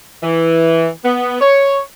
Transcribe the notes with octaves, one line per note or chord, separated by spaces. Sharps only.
E3
B3
C#5